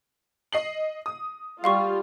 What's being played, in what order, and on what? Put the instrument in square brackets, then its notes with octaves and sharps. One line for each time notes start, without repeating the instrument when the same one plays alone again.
[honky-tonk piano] D#5 C7 F#7
D#6
[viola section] G3 F4 [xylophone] F5 C6 C#6